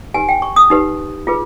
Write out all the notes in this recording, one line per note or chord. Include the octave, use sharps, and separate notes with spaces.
D#4 G4 B4 G#5
G5
C#6
D#6
D#4 G4 B4
F4 G#4 B4